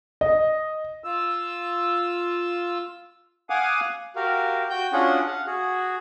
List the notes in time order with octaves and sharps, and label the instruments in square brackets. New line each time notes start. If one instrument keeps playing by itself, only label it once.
[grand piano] D#5
[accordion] F4 E6
F5 F#5 G#5 D6 D#6
[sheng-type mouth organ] F#4 G4 A#4 F5
F#4 G5 G6
C#4 D4 F4 F#4 G#4 F#5
F5 F#5
F#4 G#4